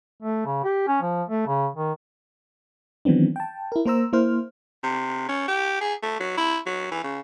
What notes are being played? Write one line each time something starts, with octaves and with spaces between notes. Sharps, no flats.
A3
C#3
G4
C#4
F3
A3
C#3
D#3
D#3 E3 F#3 B3 C4 D4
G5 A5
E4 A#4
A#3 A#4 C5 A#5 E6
A#3 E4 C5 F6
C3
C#4
G4
G#4
A3
F#3
E4
F#3
E3
C#3